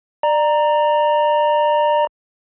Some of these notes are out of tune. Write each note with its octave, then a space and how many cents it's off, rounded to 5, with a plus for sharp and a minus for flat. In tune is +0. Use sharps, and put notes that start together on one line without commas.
D5 +25 A#5 +0